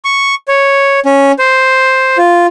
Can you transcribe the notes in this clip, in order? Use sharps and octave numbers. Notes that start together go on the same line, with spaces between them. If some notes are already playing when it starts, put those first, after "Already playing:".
C#6
C#5
C#4
C5
F4